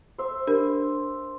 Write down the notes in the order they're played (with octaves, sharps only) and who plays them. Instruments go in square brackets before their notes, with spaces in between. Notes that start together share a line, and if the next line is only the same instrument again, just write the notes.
[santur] C5 E5
[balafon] D4 G4 A#4